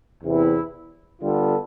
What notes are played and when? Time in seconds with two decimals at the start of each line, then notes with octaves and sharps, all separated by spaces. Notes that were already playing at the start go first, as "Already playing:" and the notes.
0.23 E2 C3 E3 B3 E4
1.21 D3 G3 B3 F4 A4